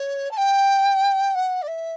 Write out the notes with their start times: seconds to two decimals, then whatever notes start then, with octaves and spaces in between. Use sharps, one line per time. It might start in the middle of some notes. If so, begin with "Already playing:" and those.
Already playing: C#5
0.31 A5
0.37 G5
1.35 F#5
1.62 D5
1.67 E5